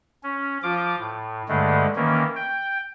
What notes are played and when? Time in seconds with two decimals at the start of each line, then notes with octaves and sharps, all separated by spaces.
0.23 C#4
0.63 F3 F4 D6
0.99 A2
1.49 G2 D3 G#3 A3
1.96 D#3 E3 A#3 C#4
2.36 G5